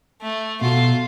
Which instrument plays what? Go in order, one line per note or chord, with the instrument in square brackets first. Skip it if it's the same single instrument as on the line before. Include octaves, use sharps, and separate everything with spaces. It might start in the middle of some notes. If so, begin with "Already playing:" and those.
[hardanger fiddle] A3
[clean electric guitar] B2 F#4 A4 [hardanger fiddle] F4